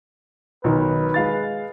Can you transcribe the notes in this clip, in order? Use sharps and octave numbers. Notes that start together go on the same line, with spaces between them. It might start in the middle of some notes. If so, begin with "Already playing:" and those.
B1 D#3 B4
G#3 F5 A6